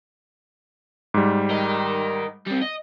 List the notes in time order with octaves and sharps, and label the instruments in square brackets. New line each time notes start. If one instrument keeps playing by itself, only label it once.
[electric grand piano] G#2 G3
[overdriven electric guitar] A#4 D#5
G3 C4
D#5